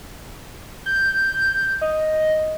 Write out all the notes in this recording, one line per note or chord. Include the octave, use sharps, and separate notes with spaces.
G6
D#5